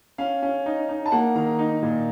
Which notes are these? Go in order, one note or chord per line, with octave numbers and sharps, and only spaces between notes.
C#4 F5
C#4
D#4
D#4
A5
A#3 F#5
D#3 A#5
D#4
A#2